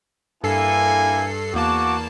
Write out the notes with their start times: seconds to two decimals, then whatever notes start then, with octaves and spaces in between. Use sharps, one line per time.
0.44 G2 A#3 E4 A4 G#5 C7
1.54 E2 A#3 F#4 A5 D6